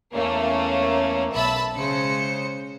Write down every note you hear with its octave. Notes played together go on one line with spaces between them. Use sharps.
E2 A3 A#3 C#4
B1 E5 A5 B5 E6
C#3 G#3 C5 C#7